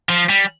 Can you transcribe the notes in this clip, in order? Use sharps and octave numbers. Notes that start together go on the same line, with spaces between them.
F3
G3